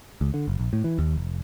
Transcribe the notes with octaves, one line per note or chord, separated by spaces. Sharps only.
C#2
D3
F#1
A#1
A2
E3
D#2
F1